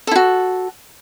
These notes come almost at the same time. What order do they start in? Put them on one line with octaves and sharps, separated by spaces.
A4 E4 F#4